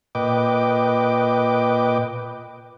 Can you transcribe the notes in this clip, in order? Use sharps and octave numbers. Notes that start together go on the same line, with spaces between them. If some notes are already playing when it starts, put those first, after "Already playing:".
A#2 B4 D#5 G5 D6